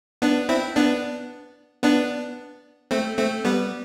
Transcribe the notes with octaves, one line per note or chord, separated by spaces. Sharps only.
B3 D4
C4 E4
B3 D4
B3 D4
A3 C4
A3 C4
G3 B3